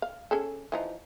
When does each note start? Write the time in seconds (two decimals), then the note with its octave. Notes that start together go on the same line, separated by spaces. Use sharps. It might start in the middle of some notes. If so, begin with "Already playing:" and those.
0.02 F5
0.31 C#4 G#4 A4
0.72 E3 F3 D#4